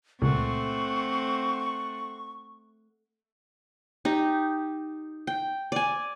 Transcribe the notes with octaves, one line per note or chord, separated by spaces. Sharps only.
C#2 A#2 A3 C4 F#5 C#6
D#4 G4
G5
D5 G#5